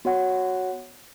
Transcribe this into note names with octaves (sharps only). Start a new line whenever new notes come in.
B3 F#4 C#5 F#5